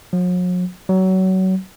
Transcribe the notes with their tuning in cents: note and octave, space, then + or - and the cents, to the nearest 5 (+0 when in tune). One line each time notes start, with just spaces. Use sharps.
F#3 -45
F#3 +25